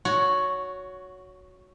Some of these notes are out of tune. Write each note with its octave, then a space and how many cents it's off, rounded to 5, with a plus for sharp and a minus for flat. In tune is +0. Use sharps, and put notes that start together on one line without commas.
F#4 -5 C#5 +15